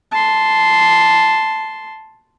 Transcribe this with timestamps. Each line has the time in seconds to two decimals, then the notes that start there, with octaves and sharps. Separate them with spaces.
0.11 A5 C6